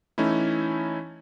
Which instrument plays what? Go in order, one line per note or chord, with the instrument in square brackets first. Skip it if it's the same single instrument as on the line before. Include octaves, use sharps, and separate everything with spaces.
[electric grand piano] E3 A3 C#4 D#4 E4